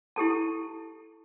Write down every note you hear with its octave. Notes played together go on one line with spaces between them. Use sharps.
E4 G4 A4 A5